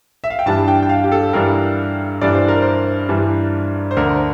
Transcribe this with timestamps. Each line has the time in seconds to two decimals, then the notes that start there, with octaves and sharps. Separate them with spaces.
0.24 E5
0.30 F5
0.39 G5
0.46 G2 E3 G3 D4 A5
0.68 G5
0.83 G5
0.89 F5
1.04 G4
1.12 A4
1.33 G2 E3 G3 D4 A#4
2.21 G2 E3 G3 D4 D5
2.34 C5
2.48 A#4
2.62 C5
3.09 G2 E3 G3 D4
3.91 C5
3.97 D2 D3 A3 D4 A#4